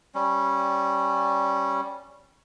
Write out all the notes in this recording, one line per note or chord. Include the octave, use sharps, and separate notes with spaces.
G3 C#4